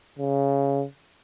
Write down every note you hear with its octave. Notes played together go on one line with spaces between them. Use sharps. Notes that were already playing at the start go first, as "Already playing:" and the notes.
C#3